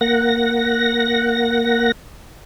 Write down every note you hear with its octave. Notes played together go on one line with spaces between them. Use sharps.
A#3 F#5 A#6